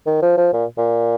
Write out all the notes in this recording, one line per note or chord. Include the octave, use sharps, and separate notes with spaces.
D#3
F3
F3
A#2
A#2